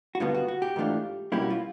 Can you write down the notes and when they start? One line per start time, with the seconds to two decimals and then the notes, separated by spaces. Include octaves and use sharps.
0.15 F#4
0.20 G2 D3 G3 B3 F4
0.34 F#4
0.48 F#4
0.62 G4
0.76 G#2 E3 A3 D4 F4
1.32 B2 G3 A#3 C#4 E4 G4
1.42 F#4
1.50 F4